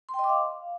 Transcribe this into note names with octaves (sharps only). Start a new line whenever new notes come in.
C6
G5
D#5
D6
F5